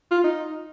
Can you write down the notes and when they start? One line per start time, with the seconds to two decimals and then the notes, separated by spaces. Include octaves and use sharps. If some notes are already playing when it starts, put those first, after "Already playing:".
0.11 F4
0.24 D#4